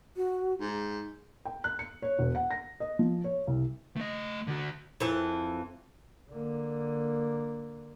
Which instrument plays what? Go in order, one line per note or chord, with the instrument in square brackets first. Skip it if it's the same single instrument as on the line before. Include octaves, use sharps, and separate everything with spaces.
[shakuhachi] F#4
[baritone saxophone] G#2
[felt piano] G5
F#6
C#7
C#5
E1
F#5
A#6
D#5
F3
C#5
C2
[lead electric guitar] A3 D#5
D3 F#4
[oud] F2 E3
[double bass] D3 A#3